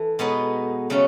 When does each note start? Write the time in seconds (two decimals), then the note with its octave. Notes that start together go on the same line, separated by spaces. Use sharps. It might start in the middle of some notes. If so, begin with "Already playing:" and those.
Already playing: E3 A4
0.19 B2 G#3 B3 D#4
0.90 C#3 F#3 A3 C#4